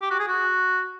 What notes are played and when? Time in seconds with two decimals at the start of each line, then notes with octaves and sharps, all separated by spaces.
0.02 G4
0.10 F#4
0.19 G#4
0.28 F#4